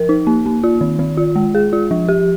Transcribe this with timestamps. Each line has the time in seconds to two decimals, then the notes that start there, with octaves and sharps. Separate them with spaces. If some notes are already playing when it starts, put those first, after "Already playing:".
Already playing: F3 A#4
0.09 D#4
0.27 A#3
0.46 A#3
0.64 F4
0.81 D#3
0.99 D#3
1.17 F4
1.36 G#3
1.55 G#4
1.73 F4
1.91 F3
2.08 G4